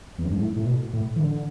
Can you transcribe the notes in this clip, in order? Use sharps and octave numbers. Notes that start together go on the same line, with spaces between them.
E2
F#2
G#2
A2
A2
B2
A2
E3
D3